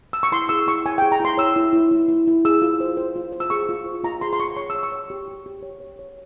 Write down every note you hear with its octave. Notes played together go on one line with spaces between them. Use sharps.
E6
C#6
E4 C6
G#4 E6
E4 C#6
C#5 G#5
G#4 G5
A#5
E4 C6
C#5 E6
E4
E4
E4
E4
E4
G#4 E6
F4
C5
C5
F4
C5
E6
G#4 C#6
F4
C5
F4 A#5
G#4 C6
C6
G#4 C#6
C#5 C#6
C#5 E6
C#6
C#5
G4
G4
G4
C#5
C#5
C#5